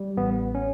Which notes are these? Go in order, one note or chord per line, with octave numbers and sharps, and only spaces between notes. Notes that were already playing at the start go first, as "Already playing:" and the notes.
Already playing: G3
A1 B3
C#4